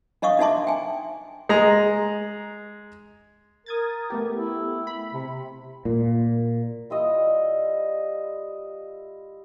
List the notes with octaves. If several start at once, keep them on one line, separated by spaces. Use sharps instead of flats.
D4 D#5 F5 C#6 D#6
D4 D#4 E5 A5 C6 D6
G5 G#5
G#3 A#5
A#4 D#6 G#6 A6
A3 B3 G4
E4
B5
C3
A#2
G3 E4 F4 D#5